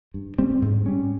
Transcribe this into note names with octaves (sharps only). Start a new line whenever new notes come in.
G2
G3 C4
G#2
G3 C#4